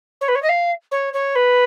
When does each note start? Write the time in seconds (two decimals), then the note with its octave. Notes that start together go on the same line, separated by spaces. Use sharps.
0.21 C#5
0.28 B4
0.35 C#5
0.42 D#5
0.49 F5
0.91 C#5
1.13 C#5
1.35 B4